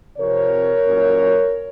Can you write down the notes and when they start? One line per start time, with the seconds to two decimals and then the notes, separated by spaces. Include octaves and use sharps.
0.18 C3 F3 C4 A#4 C#5
0.86 A#2 F#3 C#4